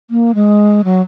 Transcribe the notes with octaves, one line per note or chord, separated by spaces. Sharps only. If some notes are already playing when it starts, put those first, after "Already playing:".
A#3
G#3
F#3